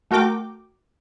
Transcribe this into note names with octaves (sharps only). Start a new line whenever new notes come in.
A3 F#4 A#4 G5 D6